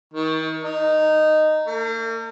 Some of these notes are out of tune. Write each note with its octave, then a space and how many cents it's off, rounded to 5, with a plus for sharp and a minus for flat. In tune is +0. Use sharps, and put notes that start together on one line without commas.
D#3 +35
D#4 -10
A#3 -45